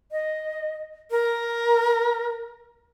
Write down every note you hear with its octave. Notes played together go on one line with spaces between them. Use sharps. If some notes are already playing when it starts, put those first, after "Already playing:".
D#5
A#4